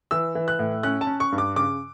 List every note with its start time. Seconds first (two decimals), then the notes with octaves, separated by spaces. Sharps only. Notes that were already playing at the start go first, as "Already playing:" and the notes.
0.11 E3 E6
0.35 E3
0.48 F#6
0.59 A2
0.83 C#4 F#6
1.01 A5
1.07 C#4
1.20 C#6
1.32 G2
1.38 D6
1.56 C#3 D6